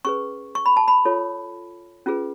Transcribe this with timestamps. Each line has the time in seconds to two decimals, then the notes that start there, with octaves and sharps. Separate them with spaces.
0.05 C#4 G#4 B4 C#6
0.55 C#6
0.66 B5
0.77 A5
0.88 B5
1.05 F4 A4 C#5
2.06 C#4 F4 G#4 B4